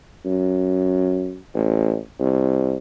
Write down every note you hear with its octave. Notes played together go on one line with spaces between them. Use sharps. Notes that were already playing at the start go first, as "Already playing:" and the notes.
F#2
A1
C2